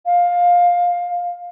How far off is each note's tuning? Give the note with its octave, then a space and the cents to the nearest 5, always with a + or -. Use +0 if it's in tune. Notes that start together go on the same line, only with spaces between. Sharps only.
F5 +15